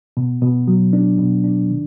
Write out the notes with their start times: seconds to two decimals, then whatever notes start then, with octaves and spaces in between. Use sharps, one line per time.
0.17 B2
0.42 B2
0.68 F#3
0.93 D4
1.18 B2
1.44 D4
1.70 D#3